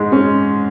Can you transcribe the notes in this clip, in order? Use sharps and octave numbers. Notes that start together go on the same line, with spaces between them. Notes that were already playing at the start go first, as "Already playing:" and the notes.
Already playing: G#2 G#3
C#4